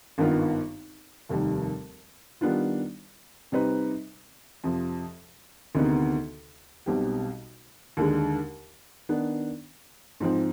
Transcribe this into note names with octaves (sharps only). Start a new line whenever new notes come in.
G#1 G2 D#3 B3 F4
F1 D#2 D#3 G3
D#3 G3 B3 D4 F4
C3 G3 C4 D#4 B4
F2 C3 F3
D2 C3 D#3 B3 D#4
B1 B2 G3 C4 G4
D#2 D3 G#3
D#3 B3 D4
G#2 F3 C4